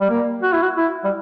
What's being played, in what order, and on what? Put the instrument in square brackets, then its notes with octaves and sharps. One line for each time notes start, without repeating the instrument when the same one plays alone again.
[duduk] G3
A#3
F#4
E4
F#4
E4
G3